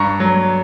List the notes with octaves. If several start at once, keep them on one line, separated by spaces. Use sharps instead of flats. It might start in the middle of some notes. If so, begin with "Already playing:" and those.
Already playing: G2 A#5 C#6
F#3